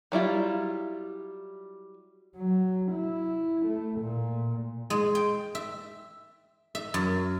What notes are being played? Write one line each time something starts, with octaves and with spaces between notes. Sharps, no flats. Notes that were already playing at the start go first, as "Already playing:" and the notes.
F#3 G3 E4 F4
F#3
E4
A3
A#2
G#3
G5
E5
E5
F#2